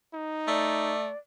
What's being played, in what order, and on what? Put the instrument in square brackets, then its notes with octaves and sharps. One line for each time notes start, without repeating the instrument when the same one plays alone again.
[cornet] D#4
[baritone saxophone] A3 [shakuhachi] D5